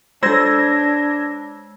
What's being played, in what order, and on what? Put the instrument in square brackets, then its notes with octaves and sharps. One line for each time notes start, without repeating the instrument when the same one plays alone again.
[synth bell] G#3 [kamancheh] D4 [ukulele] A4 C5 [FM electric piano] E6 G#6 A#6